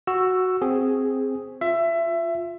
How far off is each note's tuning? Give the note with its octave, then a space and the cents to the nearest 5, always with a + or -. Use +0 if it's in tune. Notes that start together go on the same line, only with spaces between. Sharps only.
F#4 +0 E6 +10
C4 +0 G#4 +0
F4 +5 E5 +20